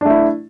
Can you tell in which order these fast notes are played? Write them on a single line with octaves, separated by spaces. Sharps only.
D4 A3 E4